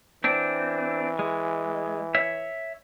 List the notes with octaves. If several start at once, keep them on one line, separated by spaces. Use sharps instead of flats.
E3 C4 D4
G#3
C#5 E5